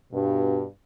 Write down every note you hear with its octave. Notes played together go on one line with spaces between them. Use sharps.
G2 B2